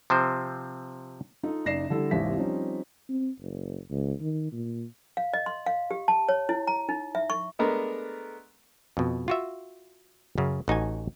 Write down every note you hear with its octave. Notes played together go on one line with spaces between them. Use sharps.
C3 F3 C4 C5
D#4 F4 A4 D#5
F#1 D#4 D5 A#6 C7 E7
D3 G3 E4 A4
G#1 D#2 C3 E3 E5 B6
F3 G3 C4 C#4 D#4
C4
F#1
C#2
D#3
A#2
F5
D#5
C6
F5
G4
A5
C#5
E4
A#5
D#4
E5
C#6
G#3 A3 B3 D4 A#4
F2 B2
F4 F#4 E5
F#2 C#3
A1 D#4 F#4 G#5